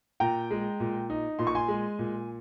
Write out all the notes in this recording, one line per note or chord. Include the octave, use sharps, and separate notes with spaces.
A#2 G5 A#5
G#3
A#2
D#4
A#2 C6
C#6
G#5 C6
G#3
A#2